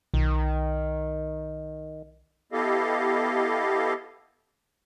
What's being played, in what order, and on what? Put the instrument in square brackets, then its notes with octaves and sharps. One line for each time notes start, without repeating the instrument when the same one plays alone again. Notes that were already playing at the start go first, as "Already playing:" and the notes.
[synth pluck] B1 [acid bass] D#3
[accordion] B3 E4 G4 A4 D#5 F5